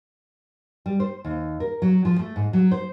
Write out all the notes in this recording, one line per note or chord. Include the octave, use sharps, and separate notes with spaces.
G3
C5
D#2
A#4
F#3
F3
A3
G#2
F#3
C5